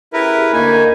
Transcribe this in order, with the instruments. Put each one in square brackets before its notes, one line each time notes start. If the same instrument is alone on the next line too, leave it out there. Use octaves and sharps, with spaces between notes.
[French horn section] C#4 G4 G#4 [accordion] E4 A#4 B4
[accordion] D2 D#4 G#5 [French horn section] A#3